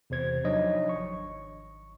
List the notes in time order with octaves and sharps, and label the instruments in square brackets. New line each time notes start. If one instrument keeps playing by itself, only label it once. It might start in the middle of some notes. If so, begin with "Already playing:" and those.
[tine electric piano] E2 C3 C5 G#6
F3 F#3 D4 D#4 C#5 D#5
G#1 C#6